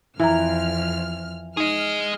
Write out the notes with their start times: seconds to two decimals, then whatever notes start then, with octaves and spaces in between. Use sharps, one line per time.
0.20 F2 E3 E4 A#5 F6
1.57 D#4 G#4 D#5 F6